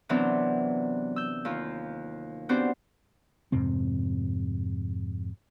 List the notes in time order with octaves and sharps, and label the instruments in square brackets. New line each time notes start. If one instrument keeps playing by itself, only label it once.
[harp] C3 E3 F#3 B3 C4 D4
E6 G6
D#2 F4
B3 C4 D4 F#4 G4 C5
[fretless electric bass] F2 G#2 C3 C4